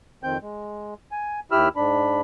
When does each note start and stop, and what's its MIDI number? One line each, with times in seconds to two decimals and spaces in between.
0.24 0.38 41
0.24 0.38 51
0.24 0.38 60
0.24 0.38 79
0.24 0.38 91
0.42 0.94 56
1.12 1.40 80
1.52 1.68 39
1.52 1.68 64
1.52 1.68 67
1.52 1.68 83
1.52 1.68 88
1.52 1.68 89
1.76 2.21 44
1.76 2.21 62
1.76 2.21 83